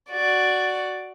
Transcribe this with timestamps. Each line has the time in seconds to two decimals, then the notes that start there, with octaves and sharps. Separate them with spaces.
0.10 F#4 D5